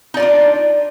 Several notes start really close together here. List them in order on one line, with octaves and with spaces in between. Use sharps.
D#4 D5 F4 D4